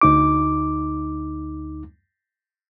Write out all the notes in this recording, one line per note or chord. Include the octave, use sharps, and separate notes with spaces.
D2 D#4 D6